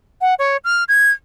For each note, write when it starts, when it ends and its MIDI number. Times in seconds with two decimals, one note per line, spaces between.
0.21 0.34 78
0.39 0.57 73
0.64 0.84 89
0.88 1.10 92